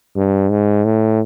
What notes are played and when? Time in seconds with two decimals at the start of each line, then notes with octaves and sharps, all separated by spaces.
0.16 G2
0.51 G#2
0.85 A2